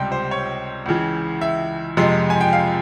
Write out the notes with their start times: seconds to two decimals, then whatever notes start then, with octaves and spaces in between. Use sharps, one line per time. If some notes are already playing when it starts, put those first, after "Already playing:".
Already playing: C#2 C3 G3 G5
0.12 C5
0.31 C#5
0.86 C#2 C#3 E3
1.41 E5
1.97 F2 C3 F3 G#3
2.30 G#5
2.41 G5
2.53 F5